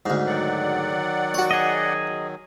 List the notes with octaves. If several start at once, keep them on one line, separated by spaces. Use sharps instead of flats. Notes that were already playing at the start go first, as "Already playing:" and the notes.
D2 G#2
D#3 F#3 D5 F#5
F#4 C#5
G#4 D#5